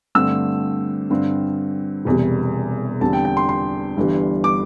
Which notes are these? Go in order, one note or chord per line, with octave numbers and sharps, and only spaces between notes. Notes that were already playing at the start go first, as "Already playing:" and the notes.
G2 D3 A3 C4 E6
G2 D3 C4
E1 E2 C3 G3
E2 D3 G3 C4 A5
G5
G5
C6
C6
G1 G2 E3 G3
D6